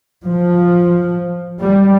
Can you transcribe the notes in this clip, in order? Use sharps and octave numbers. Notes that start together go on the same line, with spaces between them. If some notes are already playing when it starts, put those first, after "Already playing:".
F3
G3